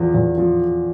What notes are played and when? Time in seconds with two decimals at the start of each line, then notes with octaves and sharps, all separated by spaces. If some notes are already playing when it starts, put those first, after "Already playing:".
Already playing: E2 F3
0.14 E2
0.38 F3